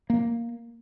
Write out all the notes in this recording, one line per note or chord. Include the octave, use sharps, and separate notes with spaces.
A#3